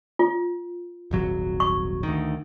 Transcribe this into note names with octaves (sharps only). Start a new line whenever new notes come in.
F4
D#1 G#1 F#3
C#6
D2 D#3